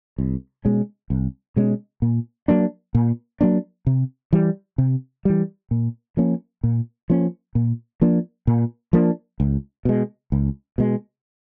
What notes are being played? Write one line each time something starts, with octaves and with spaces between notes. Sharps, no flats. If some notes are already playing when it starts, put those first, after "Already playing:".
C2
B2 G#3 C#4
C2
B2 G#3 C#4
A#2
F#3 A#3 D4
A#2
F#3 A#3 D4
C3
E3 G3
C3
E3 G3
A#2
F3 A#3 C#4
A#2
F3 A#3 C#4
A#2
F3 A#3 D4
A#2
F3 A#3 D4
C#2
B2 G#3
C#2
B2 G#3